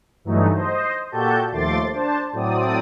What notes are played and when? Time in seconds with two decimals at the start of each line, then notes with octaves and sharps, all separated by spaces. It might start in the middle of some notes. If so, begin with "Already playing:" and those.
0.24 G2 E3 F#3 A3 D#4
0.54 C5 D#5
1.11 A#2 F#4 G4 A4 A5 G6
1.52 D#2 F3 A3 C6 D6 A6
1.92 D4 C5 A5
2.32 A2 F#3 C4 D5 D#6